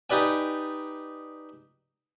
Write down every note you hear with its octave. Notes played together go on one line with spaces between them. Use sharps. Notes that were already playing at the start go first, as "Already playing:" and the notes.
D#4 G4 B4 D5 G#5